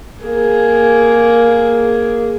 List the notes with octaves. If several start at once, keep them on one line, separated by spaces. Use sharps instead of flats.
A#3 G#4